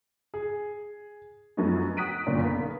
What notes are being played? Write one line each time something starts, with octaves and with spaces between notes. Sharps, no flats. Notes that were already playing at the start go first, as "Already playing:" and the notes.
G#4
F#2 F3 F#3 A3 B3 D#4
F#5 D#6 F#6 B6 D7 D#7
G1 F#2 A#2 C#4 D4 A#5
B1 A#3 B3 A#4 B6